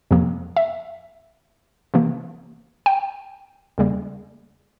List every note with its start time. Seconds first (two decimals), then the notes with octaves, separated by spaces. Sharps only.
0.11 F2 C3 F3 A#3
0.56 E5
1.94 C3 E3 A#3
2.86 G5
3.78 E2 C#3 G3 A#3